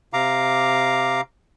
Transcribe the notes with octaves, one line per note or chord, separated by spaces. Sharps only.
C3 F5 A#5 D6